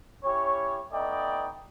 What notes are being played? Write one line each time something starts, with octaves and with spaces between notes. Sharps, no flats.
C#4 E4 G4 C#5
A3 B3 D#4 D5 D#5 G5